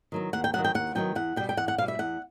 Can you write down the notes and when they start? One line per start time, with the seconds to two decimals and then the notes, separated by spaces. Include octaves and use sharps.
0.12 D#3 F#3 B3
0.33 D#2 F#5
0.44 G5
0.53 D#3 F#3 B3 F#5
0.64 G5
0.75 D#2 F#5
0.95 D#3 F#3 B3 G5
1.15 E2 F#5
1.36 B2 G3 G5
1.49 G5
1.57 E2 F#5
1.68 F#5
1.78 B2 G3 F5
1.88 E5
1.99 E2 F#5